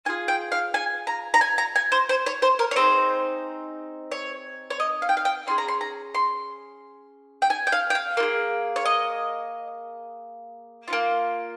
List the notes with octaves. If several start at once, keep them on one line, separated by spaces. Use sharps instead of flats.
C#4 F4 G#4 G#5
G5
F5
G#5
A#5
A#5
G#5
A#5
G#5
C5
C5
C#5
C5
A#4
C#5
C4 D#4 G#4 C5
C#5
C#5
D#5
F5
G5
F5
G5
C#4 F4 G#4 C6
A#5
C6
A#5
C6
G5
G#5
G5
F5
G5
F5
A#3 F4
G#4
C#5
D#5
C#4 F4
A#3